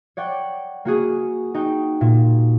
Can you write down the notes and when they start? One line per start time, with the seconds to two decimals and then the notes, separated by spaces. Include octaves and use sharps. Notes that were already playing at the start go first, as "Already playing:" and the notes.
0.17 C#5 D5 F#5 G5
0.85 A#3 F#4 G#4
1.54 D#4 F#4 G5
2.01 A#2